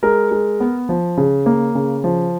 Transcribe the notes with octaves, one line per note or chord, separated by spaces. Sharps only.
G#3 A#4
G#3
B3
F3
C#3
A#3
C#3
F3